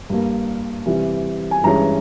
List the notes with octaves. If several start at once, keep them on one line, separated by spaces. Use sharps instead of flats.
G2 G3 A#3
C3 E3 G3
G#5
G2 E3 G#3 C#4 A#5